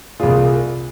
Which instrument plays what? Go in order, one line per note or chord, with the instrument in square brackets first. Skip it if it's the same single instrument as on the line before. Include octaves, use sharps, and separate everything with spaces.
[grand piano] C2 A#2 F4 G#4